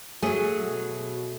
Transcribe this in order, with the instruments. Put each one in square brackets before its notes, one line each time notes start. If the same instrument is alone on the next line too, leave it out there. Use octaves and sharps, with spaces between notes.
[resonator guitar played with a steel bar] F#3 G#4 [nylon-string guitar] A3 [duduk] F#4
[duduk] B2